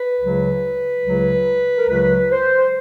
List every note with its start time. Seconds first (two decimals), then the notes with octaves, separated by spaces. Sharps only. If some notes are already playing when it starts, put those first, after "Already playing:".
Already playing: B4
0.20 C#2 C#3 F#3
1.05 C#2 C#3 F#3
1.78 A#4
1.88 C#2 C#3 F#3 B4
2.31 C5